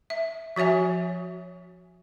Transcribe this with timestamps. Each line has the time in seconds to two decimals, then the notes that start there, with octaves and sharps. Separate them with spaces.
0.10 E5
0.56 F3 F#4 C#5 E5 G#5